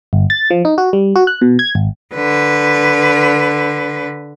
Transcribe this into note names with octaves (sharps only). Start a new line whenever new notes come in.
G1
A6
F3
D#4
F#4
G3
F#4
F#6
B2
G#6
G#1
D3 B4